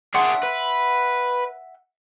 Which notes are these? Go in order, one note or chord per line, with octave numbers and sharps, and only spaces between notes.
D4 G#4 E5 F#5 C6
B4